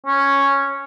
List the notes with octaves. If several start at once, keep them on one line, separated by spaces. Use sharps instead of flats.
C#4